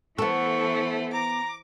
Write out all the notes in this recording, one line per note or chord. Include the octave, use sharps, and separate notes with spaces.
E3 A3 B3 A4 C5 C#6
A#5 D6